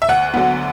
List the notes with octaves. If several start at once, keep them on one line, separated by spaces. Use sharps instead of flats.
E5
D2 F#5
D3 F#3 B3